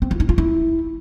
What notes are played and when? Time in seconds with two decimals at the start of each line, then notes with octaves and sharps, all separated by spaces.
0.02 C4
0.11 F4
0.20 D#4
0.29 F4
0.38 E4